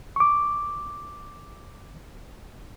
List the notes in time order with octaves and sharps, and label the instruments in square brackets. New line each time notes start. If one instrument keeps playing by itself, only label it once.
[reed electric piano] C#6 D6